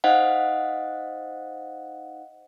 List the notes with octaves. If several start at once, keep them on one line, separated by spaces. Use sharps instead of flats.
D#4 C5 D#5 F5 F#5